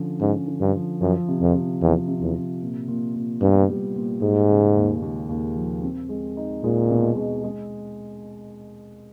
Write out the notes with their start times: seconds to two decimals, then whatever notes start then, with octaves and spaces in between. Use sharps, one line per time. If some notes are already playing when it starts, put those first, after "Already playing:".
Already playing: D3 F3 C#4
0.21 G#2 C#4
0.47 D3
0.61 G2
0.74 F3
1.01 F#2 F3
1.28 C3
1.41 F2
1.54 C3
1.82 E2 F3
2.08 C3
2.22 E2
2.35 C3
2.62 A#2
2.88 A#2
3.15 A#2
3.42 G2 B3
3.69 G3
3.96 A#2
4.22 G#2 G#3
4.50 C#3
4.76 D#2
5.02 D#2
5.29 D#2
5.56 F3
5.83 C4
6.09 G#3
6.37 D#4
6.64 A#2 G#3
6.91 B2
7.16 G#3
7.44 G#3